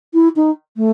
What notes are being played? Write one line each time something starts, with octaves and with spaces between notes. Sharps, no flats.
E4
D#4
A3